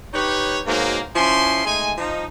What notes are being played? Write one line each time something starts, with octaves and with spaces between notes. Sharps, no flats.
D#4 G4 B4 C#5
G#2 B2 F#3 A#3
F3 C#4 E4 G#5 C6
G#3 A3 D#4 G#5
F3 D#4